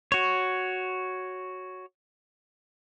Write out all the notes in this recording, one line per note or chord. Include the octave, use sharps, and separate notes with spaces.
F#4 C#5